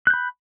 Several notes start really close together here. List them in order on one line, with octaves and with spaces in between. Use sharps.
F#6 G6 B5